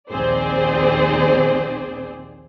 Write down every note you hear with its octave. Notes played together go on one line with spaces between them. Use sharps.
A#1 D#2 C4 G#4 C5 D5